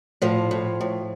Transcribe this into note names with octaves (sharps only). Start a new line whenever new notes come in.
A2 F3
A2
A2